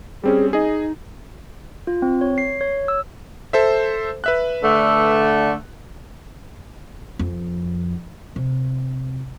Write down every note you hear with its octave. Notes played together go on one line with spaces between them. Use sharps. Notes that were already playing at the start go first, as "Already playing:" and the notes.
G3 C4 C#4 G#4
D#4 G#4 D#5
F4
C4
C#5
C7
C#5
E6
A4 C5 E5
B4 E5 F#6
D3 A3
F2
C3